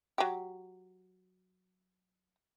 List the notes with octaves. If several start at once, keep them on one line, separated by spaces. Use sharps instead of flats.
F#3 G4